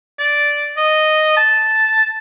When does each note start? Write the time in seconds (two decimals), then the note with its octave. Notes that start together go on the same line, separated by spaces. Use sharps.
0.19 D5
0.77 D#5
1.37 A5